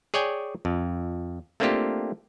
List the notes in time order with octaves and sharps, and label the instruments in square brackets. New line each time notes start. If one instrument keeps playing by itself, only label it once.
[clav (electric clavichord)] G#4 C#5 D5 G5 G#5
F2
A3 A#3 C4 D4 F4 G4